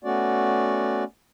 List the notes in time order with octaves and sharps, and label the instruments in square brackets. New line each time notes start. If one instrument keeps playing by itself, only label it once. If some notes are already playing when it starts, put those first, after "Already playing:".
[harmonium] A3 B3 C#4 F#4 D5